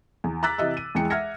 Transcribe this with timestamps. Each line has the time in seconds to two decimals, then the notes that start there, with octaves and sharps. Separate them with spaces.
0.24 E2
0.43 A#5 D6 E6 F#6 A6 B6
0.58 C3 E3 D#5 E5 E6
0.77 D#7
0.95 E2 E3 G#3 G5 C#7
1.10 E5 F#5 F6 G#6 A#6 C#7